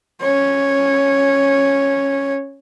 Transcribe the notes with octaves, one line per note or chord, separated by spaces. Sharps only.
C#4 C#5